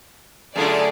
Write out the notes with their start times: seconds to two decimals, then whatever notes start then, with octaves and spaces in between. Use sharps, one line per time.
0.56 F#2 D3 A3 F4 G#4 D5